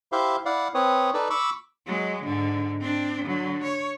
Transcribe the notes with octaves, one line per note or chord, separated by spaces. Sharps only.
E4 G4 C5 E5 F5
E4 D5 F5 F#5
C4 B4 C#5 D#6
D#4 A4 B4 D5
B5 C#6 D6 E6
F#3 G#3
G#2 D3
C4 D4
D3 F#3
C#5